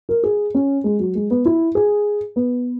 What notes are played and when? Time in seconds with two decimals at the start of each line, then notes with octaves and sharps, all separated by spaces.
0.09 A#4
0.23 G#4
0.54 C#4
0.84 G#3
0.99 F#3
1.15 G#3
1.31 B3
1.45 E4
1.75 G#4
2.36 B3